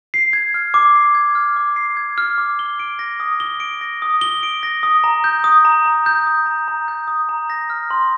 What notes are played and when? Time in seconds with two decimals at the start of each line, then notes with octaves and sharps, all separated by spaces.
0.14 C7
0.33 G#6
0.54 F6
0.74 D6
0.95 C7
1.15 G#6
1.35 F6
1.56 D6
1.76 C7
1.97 G#6
2.18 F6
2.38 D6
2.59 G7
2.80 D7
2.99 A#6
3.20 D#6
3.40 G7
3.60 D7
3.81 A#6
4.02 D#6
4.21 G7
4.43 D7
4.63 A#6
4.83 D#6
5.04 A#5
5.24 G6
5.44 D#6
5.65 A#5
5.86 A#5
6.06 G6
6.26 D#6
6.46 A#5
6.68 A#5
6.88 G6
7.08 D#6
7.29 A#5
7.50 A#6
7.70 F6
7.90 C6